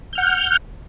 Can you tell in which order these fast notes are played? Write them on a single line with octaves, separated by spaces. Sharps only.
G6 F6 F#5